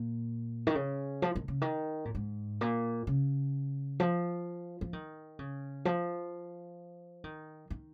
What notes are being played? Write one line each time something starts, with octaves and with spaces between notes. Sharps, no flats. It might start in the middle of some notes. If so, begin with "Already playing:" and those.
Already playing: A#2
D#3
C#3
F3
D#3
C#3
D#3
A#2
G#2
A#2
C#3
F3
F3
D#3
C#3
F3
D#3
D#3